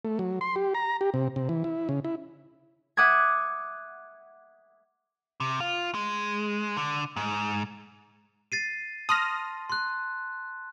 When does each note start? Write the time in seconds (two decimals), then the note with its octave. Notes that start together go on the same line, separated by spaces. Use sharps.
0.05 A3
0.19 F#3
0.41 C6
0.56 G4
0.74 A#5
1.01 G4
1.14 C3
1.36 C3
1.49 E3
1.64 E4
1.89 C#3
2.05 E4
2.97 E5 F#5 D6 D#6 G#6
5.40 C3
5.60 F4
5.95 G#3
6.77 D3
7.16 G#2
8.52 A6 C7 D#7
9.09 A5 C6 D#6 F6 A#6
9.70 C6 F#6